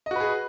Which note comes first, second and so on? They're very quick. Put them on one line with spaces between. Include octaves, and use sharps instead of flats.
D#5 F#4 B4 G#4